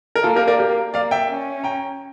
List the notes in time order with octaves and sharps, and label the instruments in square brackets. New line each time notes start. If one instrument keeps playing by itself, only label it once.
[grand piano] A#4
[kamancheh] A#3 [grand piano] F4 A4
[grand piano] G4 A#4
A#4 D5
G4 A#4
[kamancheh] A#3 [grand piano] D5 F5
[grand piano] E5 G5
[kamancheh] C#4
[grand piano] G5 A#5